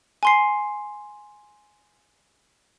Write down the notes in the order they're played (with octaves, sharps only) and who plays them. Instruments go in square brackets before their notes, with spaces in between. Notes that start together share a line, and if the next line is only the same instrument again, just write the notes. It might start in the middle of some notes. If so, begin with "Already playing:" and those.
[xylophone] G#5 C6 C7